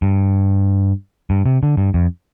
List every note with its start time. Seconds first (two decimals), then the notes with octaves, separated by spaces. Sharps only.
0.02 G2
1.30 G2
1.46 C3
1.63 D3
1.77 G2
1.94 F2